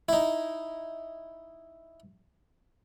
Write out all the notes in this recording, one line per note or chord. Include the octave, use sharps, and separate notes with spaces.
D#4 E4